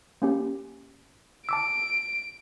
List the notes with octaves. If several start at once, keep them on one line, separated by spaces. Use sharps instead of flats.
A#3 C#4 G4
A5 D6 E6 D7